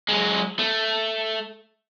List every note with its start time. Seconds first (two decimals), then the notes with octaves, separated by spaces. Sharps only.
0.09 F#3 G#3
0.59 A3